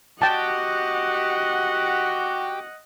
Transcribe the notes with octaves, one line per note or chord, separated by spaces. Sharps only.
F#4 G4 D#5 F#5 G5 A5